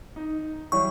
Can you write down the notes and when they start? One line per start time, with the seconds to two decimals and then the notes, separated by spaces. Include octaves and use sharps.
0.16 D#4
0.72 E3 F#3 G3 C#6